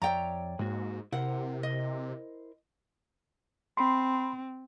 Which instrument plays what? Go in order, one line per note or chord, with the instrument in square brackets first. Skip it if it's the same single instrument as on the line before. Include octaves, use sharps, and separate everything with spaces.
[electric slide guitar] F2 D5 E5 [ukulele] C#5 G5 A#5
[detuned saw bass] G#2 [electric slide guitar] G#3 A#3 F#4
[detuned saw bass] C3 [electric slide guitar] E4 A#4 C5 [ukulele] F#5
[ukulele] D#5
[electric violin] C4 [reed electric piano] B5 C6